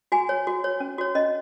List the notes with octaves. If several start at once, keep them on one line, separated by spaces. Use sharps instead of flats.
F#4 G#5
C#5
F#4
C#5
C#4
F#4 C#5
C#4 D#5